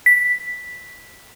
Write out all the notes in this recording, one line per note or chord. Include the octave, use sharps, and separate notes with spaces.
B6